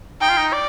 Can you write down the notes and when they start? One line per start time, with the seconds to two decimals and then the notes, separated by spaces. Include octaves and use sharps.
0.21 D#4 G5
0.29 F4
0.37 D#4
0.53 D5